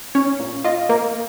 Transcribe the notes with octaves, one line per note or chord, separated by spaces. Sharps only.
C#4 C#5
A#2
F4 D#5
A#3